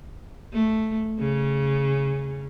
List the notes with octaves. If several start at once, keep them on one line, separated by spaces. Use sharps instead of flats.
A3
C#3